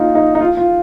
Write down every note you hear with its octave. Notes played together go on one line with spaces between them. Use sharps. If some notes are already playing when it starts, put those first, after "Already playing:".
Already playing: A#3 D#4 F4
D#4
D#4
F4
F4